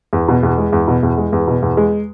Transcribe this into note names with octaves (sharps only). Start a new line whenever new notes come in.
E2
B2
E2
G#3
E2
B2
E2
G#3
E2
B2
E2
G#3